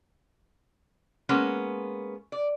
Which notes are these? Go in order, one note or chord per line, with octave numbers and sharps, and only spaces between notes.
G#3 A#3 B3 C#4
D5